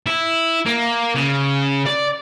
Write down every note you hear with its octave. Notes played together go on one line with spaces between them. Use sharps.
E4
A#3
C#3
D5